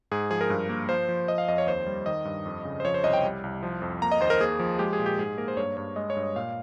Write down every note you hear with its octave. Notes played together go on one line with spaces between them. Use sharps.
G#2 G#4
F3 G#4
A#4
G2
A#3
F3 C5
F3
F3 D#5
F5
F2 D#5
C#5
D#2 C5
G3
D#3 D#5
G2
F2
C#3
C5
F3 C#5
C5
C2 D#5
G5
G3
C2
F3
F2
A#3 A#5
D#5
D#2 C5
A#4
A#3 G#4
F3
G#3 G4
G#4
A#2
G4
G#2 G#4
A#3 A#4
C5
G2 C#5
G2 C#5
G#3 D#5
C#5
G2
D#5
A#2 F5